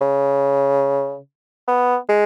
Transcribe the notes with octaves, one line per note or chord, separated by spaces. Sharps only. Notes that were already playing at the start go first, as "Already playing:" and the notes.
C#3
B3
G#3